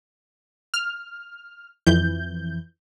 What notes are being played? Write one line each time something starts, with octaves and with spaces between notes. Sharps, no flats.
F6
F2 E3 G6